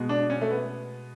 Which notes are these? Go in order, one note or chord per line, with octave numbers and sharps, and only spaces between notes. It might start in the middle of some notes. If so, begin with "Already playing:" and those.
Already playing: B2 G#3
D4
C#4
A3
B3